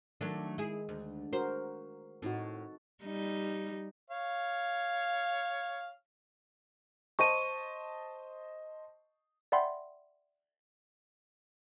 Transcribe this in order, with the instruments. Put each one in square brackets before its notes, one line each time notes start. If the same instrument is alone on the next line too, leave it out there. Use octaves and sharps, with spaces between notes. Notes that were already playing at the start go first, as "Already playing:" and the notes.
[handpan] D#3 [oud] F#3 A3 D4
[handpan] G#3 [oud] E4 G#4
[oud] D2
[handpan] F#4 A#4 [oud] C5
[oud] A2 [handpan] C4 D#4 F#4
[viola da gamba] G3 D#4
[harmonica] C#5 F5
[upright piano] C5 D#5 A5 [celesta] C#6 D#7
[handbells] D5 E5 F#5 G5 B5 C6